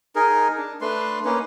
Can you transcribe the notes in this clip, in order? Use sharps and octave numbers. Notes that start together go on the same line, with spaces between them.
D#4 G#4 A#4
D4
A3 D4 B4 C6
A#3 C#4 D#4 B4